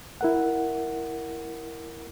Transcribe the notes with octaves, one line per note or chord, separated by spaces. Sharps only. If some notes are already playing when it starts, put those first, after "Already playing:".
E4 A#4 F#5